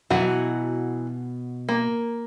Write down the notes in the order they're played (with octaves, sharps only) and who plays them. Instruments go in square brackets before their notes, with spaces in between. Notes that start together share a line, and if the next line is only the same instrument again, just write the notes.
[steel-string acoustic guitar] B2 F#5 [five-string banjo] E3 F#3 F#4
[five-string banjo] A#3